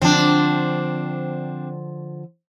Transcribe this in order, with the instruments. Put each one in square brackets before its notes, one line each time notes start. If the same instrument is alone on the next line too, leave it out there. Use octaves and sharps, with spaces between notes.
[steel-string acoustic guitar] D3 F3 [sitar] C4 D4